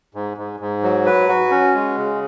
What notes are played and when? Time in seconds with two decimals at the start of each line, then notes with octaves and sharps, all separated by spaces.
0.15 G#2
0.37 G#2
0.60 G#2
0.83 F#3
1.06 B4
1.29 F#4
1.51 C#4
1.74 G#3
1.97 C#3